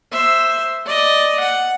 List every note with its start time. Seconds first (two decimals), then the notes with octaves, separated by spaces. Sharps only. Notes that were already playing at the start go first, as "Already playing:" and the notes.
0.11 C5 E5
0.86 D5 D#5
1.40 F#5